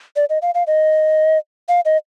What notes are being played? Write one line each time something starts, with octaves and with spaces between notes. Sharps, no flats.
D5
D#5
F5
F5
D#5
F5
D#5